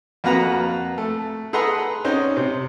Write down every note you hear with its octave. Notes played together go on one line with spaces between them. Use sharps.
F2 A#3 F#4 B4 F#5 A#5
A3
G#4 A4 B4 F#5 A#5 C6
C4 C#4 D#4 C5
C3